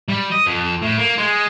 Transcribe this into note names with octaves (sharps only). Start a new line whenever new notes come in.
G3
D#5
F2
A2
A#3
G#3